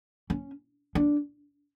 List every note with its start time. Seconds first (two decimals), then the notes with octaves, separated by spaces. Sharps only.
0.30 C#4
0.95 D4